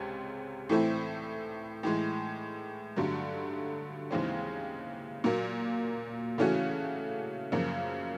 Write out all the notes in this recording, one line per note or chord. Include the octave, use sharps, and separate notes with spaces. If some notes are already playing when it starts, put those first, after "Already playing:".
Already playing: C#2 C3 G#3 C#4
A2 E3 A3 C4 E4
A2 E3 G#3
G2 D3 F#3 A3
D#2 C#3 E3 G#3 C4
A#2 F#3 A#3
C#3 E3 A3 C#4 F#4
F#2 C#3 F3 A#3